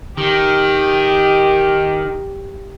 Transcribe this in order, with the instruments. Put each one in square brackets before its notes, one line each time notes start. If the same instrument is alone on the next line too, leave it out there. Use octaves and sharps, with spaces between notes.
[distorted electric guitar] D#3 [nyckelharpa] G4